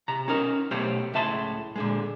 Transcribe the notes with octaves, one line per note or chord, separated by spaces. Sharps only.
C3 A#5
C#4 D#4 A#4
B1 B2 A3 G4 C5 C#5
C#2 A2 E5 A5 C6
A#2 D3 G#3